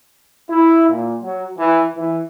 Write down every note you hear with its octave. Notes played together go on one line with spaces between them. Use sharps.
E4
A#2
F#3
E3
E3